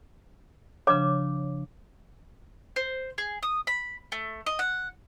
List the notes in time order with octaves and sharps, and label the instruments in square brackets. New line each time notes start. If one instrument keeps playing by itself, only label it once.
[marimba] C#3 F3 D4 [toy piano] C#5 D6
[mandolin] C5
G#4
D#6
B5
A3
D#5
F#5